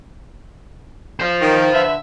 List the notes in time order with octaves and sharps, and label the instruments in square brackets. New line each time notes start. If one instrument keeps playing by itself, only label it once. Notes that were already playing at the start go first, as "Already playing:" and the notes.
[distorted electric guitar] C5 F5
[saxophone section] D#3
D3 B4 E5